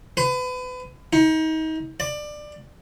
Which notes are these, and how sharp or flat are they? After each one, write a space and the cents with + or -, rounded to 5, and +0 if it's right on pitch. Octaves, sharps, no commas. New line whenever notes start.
B4 +30
D#4 +30
D5 +20